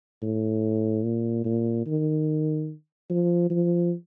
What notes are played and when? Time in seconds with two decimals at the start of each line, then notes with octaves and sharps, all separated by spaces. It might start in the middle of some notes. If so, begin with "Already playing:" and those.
0.22 A2
1.04 A#2
1.45 A#2
1.86 D#3
3.10 F3
3.50 F3